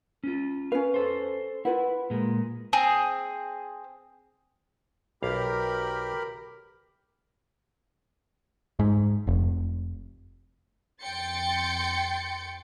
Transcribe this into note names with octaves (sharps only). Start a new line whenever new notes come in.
C#4 F4
C#4 B4 F5
A4 C5
E4 F4 B4 F#5
A#2 G#3
C4 G#4
B1 G4 A#4 F5 B5
G#2
F1
F2 G5 C6 G6 A6 C#7